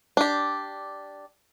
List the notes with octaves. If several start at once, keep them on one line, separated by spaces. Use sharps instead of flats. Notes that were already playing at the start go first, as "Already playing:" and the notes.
D4 G4